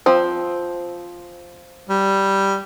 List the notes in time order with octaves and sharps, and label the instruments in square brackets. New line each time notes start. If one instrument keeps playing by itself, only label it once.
[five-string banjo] F3 C4
[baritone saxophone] G3